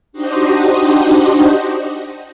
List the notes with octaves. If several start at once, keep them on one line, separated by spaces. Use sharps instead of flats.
D4 D#4 F#4 G4 C5 D#5